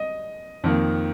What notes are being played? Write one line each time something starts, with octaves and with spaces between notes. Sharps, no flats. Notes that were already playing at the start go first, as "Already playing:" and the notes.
Already playing: D#5
F2 D#3 A#3